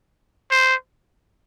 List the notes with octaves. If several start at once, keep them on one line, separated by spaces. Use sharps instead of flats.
C5